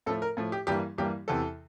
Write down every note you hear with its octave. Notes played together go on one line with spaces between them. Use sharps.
A2 F3 A3 A4
A#4
A2 F3 A3
G4
G2 E3 G3 A#3 G4
G2 E3 G3 A#3 G4
E2 C3 E3 A4